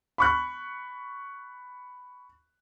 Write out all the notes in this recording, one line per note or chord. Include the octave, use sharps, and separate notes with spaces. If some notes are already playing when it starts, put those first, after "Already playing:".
B5 C#6 F#6